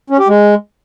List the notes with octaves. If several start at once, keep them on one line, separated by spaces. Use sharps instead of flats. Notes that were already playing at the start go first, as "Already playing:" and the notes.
C#4
G4
G#3